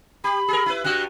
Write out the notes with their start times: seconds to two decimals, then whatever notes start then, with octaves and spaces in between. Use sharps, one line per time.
0.24 G4 B5
0.48 G#4 A#4
0.66 E4 B4
0.84 G2 G3 F#4 F#6